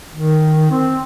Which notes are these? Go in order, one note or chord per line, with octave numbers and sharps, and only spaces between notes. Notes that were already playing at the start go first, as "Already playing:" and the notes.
D#3
C4